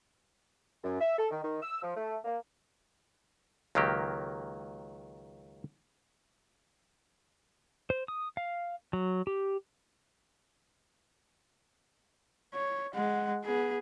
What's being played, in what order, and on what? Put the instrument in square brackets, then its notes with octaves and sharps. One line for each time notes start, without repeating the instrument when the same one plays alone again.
[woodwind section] F#2
E5
A4
D#3
D#3
E6
F3
A3
A#3
[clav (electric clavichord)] C#2 D#3 F#3 A#3 G4
[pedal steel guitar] C5
D#6
F5
F#3
G4
[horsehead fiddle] C#5
G#3 F#5
B3 G#4